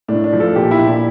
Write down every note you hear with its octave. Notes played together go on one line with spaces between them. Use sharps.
A2 D4
D4
F3
A4
A#2 G4
E4
A#2
D4